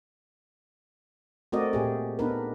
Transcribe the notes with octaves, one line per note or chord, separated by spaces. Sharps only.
A3 C4 F#4 A#4 D5 D#5
A#2 G4 G#4
B3 D4 D#4 A#4 B4